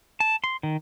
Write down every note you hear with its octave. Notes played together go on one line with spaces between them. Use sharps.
A5
C6
D#3